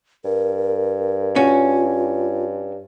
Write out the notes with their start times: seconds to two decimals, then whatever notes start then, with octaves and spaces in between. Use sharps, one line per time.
0.25 G2 A#4
1.36 C#4 F4 F#4